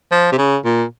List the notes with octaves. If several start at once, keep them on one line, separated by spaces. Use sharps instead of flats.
F3
C3
C#3
A#2